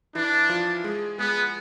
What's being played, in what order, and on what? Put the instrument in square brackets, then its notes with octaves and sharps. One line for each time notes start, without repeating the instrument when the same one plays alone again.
[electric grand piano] E3 E4 [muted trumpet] D4
[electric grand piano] F3 F4
G#3 G#4
[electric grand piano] G#3 G#4 [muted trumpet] B3